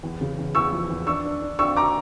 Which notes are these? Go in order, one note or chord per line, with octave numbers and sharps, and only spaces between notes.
E2
C#3
E2
E2 C#6 E6
F3
E2
D4 C#6 E6
D4
D4
D4 C#6 E6
A#5 D6